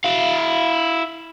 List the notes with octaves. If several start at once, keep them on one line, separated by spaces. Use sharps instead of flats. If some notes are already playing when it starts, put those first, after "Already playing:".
E4 F5